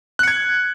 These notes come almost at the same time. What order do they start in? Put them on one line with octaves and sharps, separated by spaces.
F#6 C#7 G#6